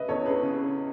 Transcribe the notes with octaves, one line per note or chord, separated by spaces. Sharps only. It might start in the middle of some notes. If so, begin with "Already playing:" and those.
Already playing: C#3 B4 D#5 E5
E2 A4 C#5
G#4 B4
C#3